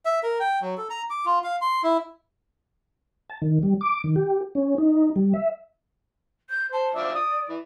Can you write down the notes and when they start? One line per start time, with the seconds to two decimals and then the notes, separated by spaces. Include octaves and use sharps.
0.05 E5
0.23 A#4
0.40 G5
0.61 F#3
0.78 A4
0.90 A#5
1.10 D6
1.25 F4
1.44 F5
1.61 C6
1.83 E4
3.29 A5
3.42 D#3
3.63 G3
3.81 D6
4.04 D#3
4.16 G4
4.55 C#4
4.78 D#4
5.16 G3
5.33 E5
6.49 G6
6.72 C5 A5
6.95 F3 D4 D5 E5
7.15 D#6
7.49 E3